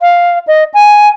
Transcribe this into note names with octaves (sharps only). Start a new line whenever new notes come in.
F5
D#5
G#5